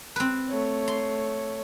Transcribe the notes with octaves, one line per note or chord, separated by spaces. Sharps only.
C4 B4
A3 C#5
C6